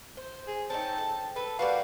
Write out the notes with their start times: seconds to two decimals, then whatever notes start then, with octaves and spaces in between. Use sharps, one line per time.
0.17 C5
0.47 G#4
0.70 C4 C#4 D#4 A5
0.98 A4
1.36 A4 B4
1.59 G3 A#3 F#4 B4 F5